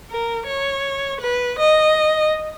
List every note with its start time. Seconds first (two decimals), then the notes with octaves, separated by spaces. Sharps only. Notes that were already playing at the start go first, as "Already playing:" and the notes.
0.10 A#4
0.47 C#5
1.21 B4
1.59 D#5